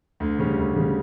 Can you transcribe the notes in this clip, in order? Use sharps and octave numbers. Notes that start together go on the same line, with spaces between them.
D2
C#3 G3 C#4
D2
C#3 G3 C#4